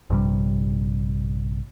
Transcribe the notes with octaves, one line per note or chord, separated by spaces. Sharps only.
A#1 G2 C3 G3